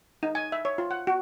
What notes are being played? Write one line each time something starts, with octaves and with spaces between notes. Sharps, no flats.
D#4
G#5
E5
C#5
F4
F#5
F#4